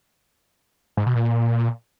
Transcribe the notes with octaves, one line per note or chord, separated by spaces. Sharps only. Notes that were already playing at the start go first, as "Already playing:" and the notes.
G#2
B2
A#2